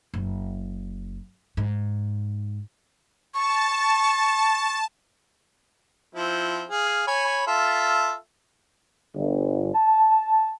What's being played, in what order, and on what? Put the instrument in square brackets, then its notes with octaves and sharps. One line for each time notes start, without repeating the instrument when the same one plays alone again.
[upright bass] F#1
G#2
[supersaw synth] A5 [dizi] C#6
[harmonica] F3 C4 E4
G#4 F5
C#5 G#5 B5
F4 A4 E5
[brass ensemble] G1
A5